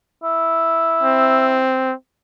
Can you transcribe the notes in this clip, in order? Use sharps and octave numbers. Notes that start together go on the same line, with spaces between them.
E4
C4